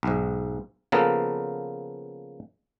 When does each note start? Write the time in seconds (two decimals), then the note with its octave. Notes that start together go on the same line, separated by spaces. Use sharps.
0.03 B1 G#2
0.92 C#3 F3 A#3 B3 A4 A#4